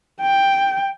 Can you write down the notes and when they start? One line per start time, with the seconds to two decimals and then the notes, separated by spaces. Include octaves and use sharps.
0.21 G5